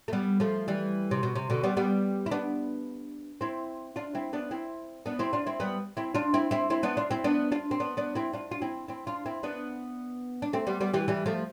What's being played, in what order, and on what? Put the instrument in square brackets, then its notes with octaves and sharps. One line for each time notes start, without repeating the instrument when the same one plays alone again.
[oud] A3
G3 B3
F3 A3
E3 G3
C3
B2
C3
B2 D3
G3 B3
G3 B3
E4
B3 D4
C4 E4
D4 F4
C4 E4
B3 D4
C4 E4
B3 D4
C4 E4
D4 F4
C4 E4
G3 B3
C4 E4
D4 F4
C4 E4
C4 E4
C4 E4
B3 D4
D4 F4
C4 E4
B3 D4
D4 F4
C4
B3 D4
B3 D4
C4 E4
D4 F4
F4
C4 E4
C4 E4
D4 F4
C4 E4
B3 D4
D4
A3 C4
G3 B3
G3 B3
E3 G3
E3 G3
F3 A3